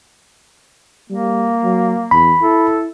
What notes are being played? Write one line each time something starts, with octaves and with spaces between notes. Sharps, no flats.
G3 A#3
F#3
E2 B5
E4 A4